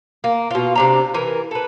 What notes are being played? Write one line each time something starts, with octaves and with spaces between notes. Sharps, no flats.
A#3
B2 F4
C3 D4 A#5
E3 A#4
A4 B4